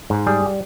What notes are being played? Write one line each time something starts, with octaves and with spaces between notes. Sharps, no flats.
G#2
G3 G#4